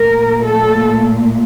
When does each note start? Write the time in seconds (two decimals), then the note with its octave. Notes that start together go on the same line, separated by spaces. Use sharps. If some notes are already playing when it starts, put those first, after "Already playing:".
Already playing: A#2 A3 A#4
0.45 A4